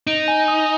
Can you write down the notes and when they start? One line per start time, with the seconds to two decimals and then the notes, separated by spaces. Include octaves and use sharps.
0.07 D#4 D7
0.28 G#5
0.48 D#6